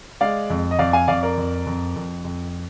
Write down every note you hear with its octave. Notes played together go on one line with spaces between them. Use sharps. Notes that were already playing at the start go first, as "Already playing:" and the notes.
G#3 D5 F5
F2
D#5
F2 D5 F5
F5 G#5
F2 D5 F5
A#4 D5
F2
F2
F2
F2